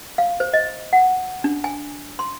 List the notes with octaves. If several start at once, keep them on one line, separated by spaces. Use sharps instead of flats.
F5
C5
D#5
F#5
D4
G#5
C6